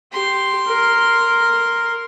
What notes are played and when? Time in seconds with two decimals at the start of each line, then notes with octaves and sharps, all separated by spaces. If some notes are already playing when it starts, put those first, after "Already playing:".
0.12 G4 C6
0.68 A#4